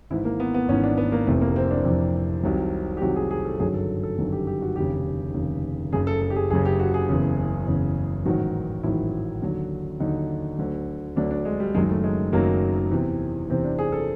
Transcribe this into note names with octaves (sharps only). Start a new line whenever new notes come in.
G#1 G#2 E3 E4
A#3
B3
B3
G#1 G#2 E3 C#4
D4
B3
A#3
F1 F2 C3 E3 A3
A#3
C4
D4
F1 F2 C3 E3
C2 C3 D#3 F#3
G4
C2 C3 D#3 F#3 F#4
G#4
G#4
A4
G1 F#2 D#3 F#3 G#4
A4
A4
G1 F#2 D#3 F#3
G4
G4
F#4
F1 D#2 C#3 G4
F1 D#2 C#3
F#1 F#2 C#3 G#4
A4
A4
G4
G#4
F#1 F#2 C#3 G#4
G4
F#4
G#4
F#1 E2 C#3
F#1 E2 C#3
A1 G#2 D#3 F#3 F#4
A1 G#2 D#3 F#3 E4
D#2 D3 F#3
D#2 D3 F#3 D#4
D2 D3 F#3
D2 D3 F#3 D4
D4
G#3
G3
F#1 F#2 D#3 F#3 G#3
A3
G#3
F#1 F#2 D#3 F#3 A#3
E2 C3 E3
E2 C3 E3 C4
D4
G#4
A4